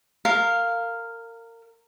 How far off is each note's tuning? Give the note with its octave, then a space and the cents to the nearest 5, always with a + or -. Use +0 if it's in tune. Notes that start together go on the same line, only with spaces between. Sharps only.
A#4 -25 F5 +0